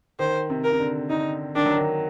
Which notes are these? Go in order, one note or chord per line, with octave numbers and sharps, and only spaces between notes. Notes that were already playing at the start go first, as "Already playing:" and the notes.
D#3 C5
C3
A#4
C3
D3
D3 D#4
D#3 D4
F#3
D#3